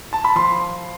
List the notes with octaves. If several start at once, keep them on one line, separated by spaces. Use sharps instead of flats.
A5
B5
F3 C6